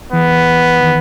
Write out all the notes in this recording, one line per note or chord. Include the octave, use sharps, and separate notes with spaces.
E3 B3
D#3